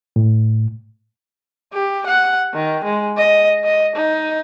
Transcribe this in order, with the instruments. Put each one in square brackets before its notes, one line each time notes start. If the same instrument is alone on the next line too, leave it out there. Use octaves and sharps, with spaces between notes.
[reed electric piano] A2
[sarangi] G4
F#5
D#3
G#3
D#5
D#5
D#4